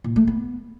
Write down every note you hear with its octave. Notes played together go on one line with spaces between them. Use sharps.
A#2
A3
B3